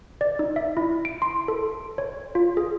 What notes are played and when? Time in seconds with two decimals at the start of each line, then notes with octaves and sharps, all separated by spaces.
0.21 D5
0.39 D#4
0.56 E5
0.77 E4
1.05 D7
1.22 C6
1.48 A4
1.98 C#5
2.35 F4
2.57 G#4